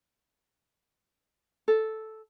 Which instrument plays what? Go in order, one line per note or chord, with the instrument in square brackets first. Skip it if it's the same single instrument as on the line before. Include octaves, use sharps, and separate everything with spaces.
[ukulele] A4